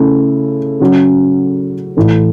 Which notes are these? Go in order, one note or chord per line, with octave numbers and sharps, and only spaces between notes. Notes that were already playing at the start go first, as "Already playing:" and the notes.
Already playing: C#3 A3 E4
C#3 F#3 C#4 F#4
A2 E3 A3 E4